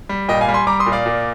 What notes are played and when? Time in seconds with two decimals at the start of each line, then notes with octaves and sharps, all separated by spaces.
0.09 G3
0.29 A#2 D#5 G5
0.41 F5 G#5
0.48 G3
0.54 G#5 C6
0.67 G3 A#5 D6
0.80 C6 D#6
0.86 A#2
0.92 D5 F5
1.06 A#2